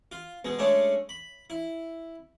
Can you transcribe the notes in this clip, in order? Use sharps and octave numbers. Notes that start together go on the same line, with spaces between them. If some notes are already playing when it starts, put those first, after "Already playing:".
F4
B2 G#3
G#3 A3 C#4 D4
B5
E4